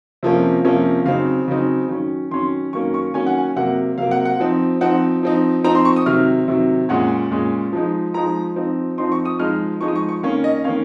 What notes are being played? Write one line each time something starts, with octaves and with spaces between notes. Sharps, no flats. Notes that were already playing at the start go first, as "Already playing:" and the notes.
C3 F3 A#3 C#4
C3 F3 A#3 C#4
C#3 F#3 C4 D#4 F5
C#3 F#3 C4 D#4
D#3 F#3 C#4
D#3 F#3 C#4 C6
D#3 F#3 A#3 C#4 C#6
C#6
D#3 F#3 A#3 C#4 G#5
F#5
G#5
C3 F#3 A#3 F#5
C3 F#3 A#3 F5
F#5
F#5
F3 C4 D#4
F3 C4 D#4 F#5
F3 C4 D#4
F3 C4 D#4 A#5
C6
C#6
D#6
C3 D#3 F#3 F6
C3 D#3 F#3
A#2 G#3 C#4 F#5
A#2 G#3 C#4
F3 G#3 D#4
F3 G#3 D#4 A#5
F3 C4 D#4
F3 C4 D#4 C6
C#6
D#6
F3 G#3 D#4 F6
F3 G#3 D#4 C#6
D#6
C#6
C#6
D#3 A#3 C#4 F5
D#5
D#3 A#3 C#4 F5